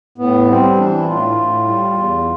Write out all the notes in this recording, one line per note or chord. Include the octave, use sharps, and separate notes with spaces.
A2 B3
G3 C4
E3 D4
E4
A2 F4
A2
G3
E2